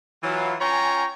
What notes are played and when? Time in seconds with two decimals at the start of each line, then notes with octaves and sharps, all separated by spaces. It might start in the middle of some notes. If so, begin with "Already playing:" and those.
0.23 E3 F#3 F4
0.61 C#4 F4 C#5 G5 G#5 A#5